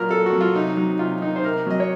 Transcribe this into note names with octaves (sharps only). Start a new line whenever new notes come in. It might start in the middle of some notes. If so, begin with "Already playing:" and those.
Already playing: A#2 F#3 A#4
A#2 A4
F#4
F#3
F4
C3 D#4
F#3 D#4
C3 F4
D#3 D#4
C5
C3 A#4
F#3 D#5
C#5